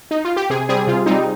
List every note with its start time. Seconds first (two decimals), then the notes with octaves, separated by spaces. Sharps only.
0.11 D#4
0.25 F4
0.36 G4
0.50 C3 G#4
0.69 G3 C4 G#4
0.87 C3 F4
1.06 G3 C4 D#4